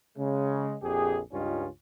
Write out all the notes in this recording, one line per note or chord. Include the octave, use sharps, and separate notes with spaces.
C#3 G#3
A#1 F2 G4 G#4
C#2 G2 G3 C#4 D#4 F4